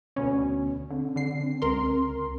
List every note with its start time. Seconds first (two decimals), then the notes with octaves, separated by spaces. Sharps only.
0.16 D2 B2 C#4
0.90 D3 C4
1.16 D3 C7
1.62 C#2 A#4 C6